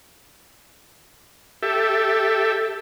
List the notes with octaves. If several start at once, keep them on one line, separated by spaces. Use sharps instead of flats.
G4 A4 E5